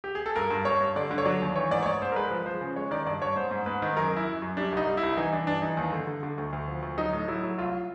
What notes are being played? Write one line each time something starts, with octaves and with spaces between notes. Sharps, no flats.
G4
G#4
A4
G2 A#4
G2
G2 C#5
G2
D3 D5
D3
C#5
F#3 D5
D#2
E3 C#5
G#2 D5
C#5
G#2 D5
G#2 C5
A#4
G#3 B4
F3
F3 C5
C#3
G#3 C#5
D#3 D5
G2 D5
G2 C#5
G#2 C5
G#2
G#2 B4
D#3
F#2 A#4
F#2 E4
F#2
F#2
G3 D4
C2 D#4
G3
E4
C2
E3 D#4
E3 D4
G2 D4
E3 D#4
D#2
D3
D3
D3
D2
D2
F3
D2
F#3 D#4
A2
F#3 E4
F#3
C2 F4